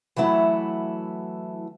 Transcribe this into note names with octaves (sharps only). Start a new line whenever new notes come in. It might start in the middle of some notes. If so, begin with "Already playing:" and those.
E3 F#3 A3 E4 F#4